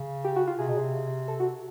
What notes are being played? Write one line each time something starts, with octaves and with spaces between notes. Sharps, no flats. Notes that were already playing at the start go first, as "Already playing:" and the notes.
Already playing: C#3
G4
F#4
F4
C3 G#4
B2
C3
A4
F#4